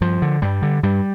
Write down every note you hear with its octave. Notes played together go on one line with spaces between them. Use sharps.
G2 F3
D3
G2 G3
D3
G2 G3